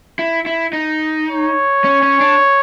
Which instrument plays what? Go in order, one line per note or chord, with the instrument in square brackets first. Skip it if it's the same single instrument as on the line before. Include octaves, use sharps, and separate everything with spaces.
[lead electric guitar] E4
E4
D#4
[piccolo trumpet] C#5
[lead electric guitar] C#4
C#4
D4